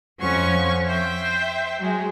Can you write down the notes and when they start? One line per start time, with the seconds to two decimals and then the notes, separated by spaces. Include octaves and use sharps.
0.20 F2 F3 C#4 F#5 G#5 C#6
0.87 C5 E5 G5
1.79 F#3 G#3